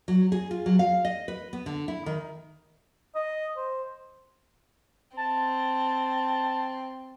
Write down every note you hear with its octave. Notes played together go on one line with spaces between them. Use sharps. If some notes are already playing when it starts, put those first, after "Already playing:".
F#3
G#4
F4
F#3
F5
D#5
B4
B3
D3
E4
D#3
D#5
C5
C4 A5